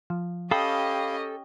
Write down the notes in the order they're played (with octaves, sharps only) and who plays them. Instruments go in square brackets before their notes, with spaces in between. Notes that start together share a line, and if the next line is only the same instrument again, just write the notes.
[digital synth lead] F3
[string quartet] C#4 G4 D#5 [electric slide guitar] A4 [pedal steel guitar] F5 B5 D#6 [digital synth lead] G5